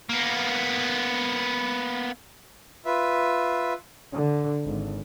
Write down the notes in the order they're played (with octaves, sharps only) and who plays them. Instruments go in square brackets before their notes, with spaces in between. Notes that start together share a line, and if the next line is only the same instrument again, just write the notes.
[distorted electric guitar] A#3 B3
[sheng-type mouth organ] F4 B4 E5
[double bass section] D3
G#1